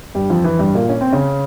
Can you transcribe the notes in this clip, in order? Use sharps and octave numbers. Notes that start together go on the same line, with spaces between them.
G2 G3
F2 F3
E3
G2 G3
A#2 A#3
C#4
C4
C#3 C#4